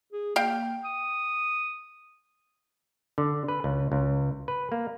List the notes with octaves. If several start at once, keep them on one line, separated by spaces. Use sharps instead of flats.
G#4
A#3 F5 G5
D#6
D3
B4
C#2
C#2
B4
A#3